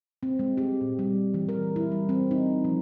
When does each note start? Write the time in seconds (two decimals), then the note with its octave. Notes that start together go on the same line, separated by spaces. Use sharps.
0.23 C4
0.39 G#3
0.57 G4
0.81 A#2
0.99 G3
1.34 E3
1.49 A#4
1.76 E4
1.92 G3
2.09 C4
2.31 D#4
2.64 F3